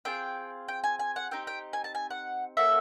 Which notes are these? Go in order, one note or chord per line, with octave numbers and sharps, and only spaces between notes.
C4 F4 G#4 G5
G5
G#5
G#5
F#5
C4 D#4 G4 G5
G5
G#5
A5
G#5
F#5
A#3 C#4 F#4 A4 E5